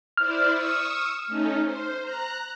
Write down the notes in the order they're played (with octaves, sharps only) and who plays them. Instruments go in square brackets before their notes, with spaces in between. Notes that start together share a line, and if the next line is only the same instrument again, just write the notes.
[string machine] E4 C5 D5 [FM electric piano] F6
[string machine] C#6 D#6 E6
A3 C#4 D#4
C5
A#5 F#6